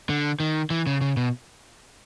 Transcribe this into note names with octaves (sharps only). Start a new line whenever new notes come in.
D3
D#3
E3
C#3
C#3
B2